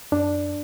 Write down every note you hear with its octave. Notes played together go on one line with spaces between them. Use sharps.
F#2 D4